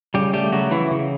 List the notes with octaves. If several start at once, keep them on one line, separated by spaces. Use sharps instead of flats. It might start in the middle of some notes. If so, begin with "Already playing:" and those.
C#3 G3 G4
G3 A3 G4
C#3 F#3 F#4
C#3 E3 E4
C#3